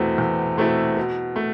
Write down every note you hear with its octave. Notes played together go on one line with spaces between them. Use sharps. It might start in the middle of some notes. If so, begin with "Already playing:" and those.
Already playing: E2 B2 A3 C4 E4
E2
B2 A3 C4 E4
B2
A3